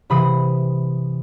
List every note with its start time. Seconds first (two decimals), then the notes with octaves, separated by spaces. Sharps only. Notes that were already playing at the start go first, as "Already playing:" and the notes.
0.10 C3 E3 B5 D#6